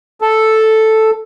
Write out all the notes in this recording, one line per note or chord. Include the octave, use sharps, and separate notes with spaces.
A4